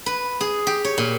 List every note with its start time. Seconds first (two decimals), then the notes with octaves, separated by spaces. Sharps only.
0.06 B4
0.41 G#4
0.67 G4
0.84 C#5
0.98 A#2